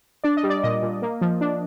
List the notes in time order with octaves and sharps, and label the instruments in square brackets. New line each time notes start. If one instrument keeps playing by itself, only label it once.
[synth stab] D4 D5
D#5
G3
D5
A#2 D#5
A#2
A#3
F3
D4